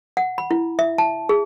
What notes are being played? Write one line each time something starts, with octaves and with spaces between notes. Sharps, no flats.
F#5
B5
E4
E5
A5
G#4